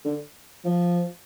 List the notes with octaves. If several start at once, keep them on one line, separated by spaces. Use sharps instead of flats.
D3
F3